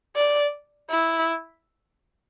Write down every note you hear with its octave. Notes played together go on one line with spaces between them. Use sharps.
D5
E4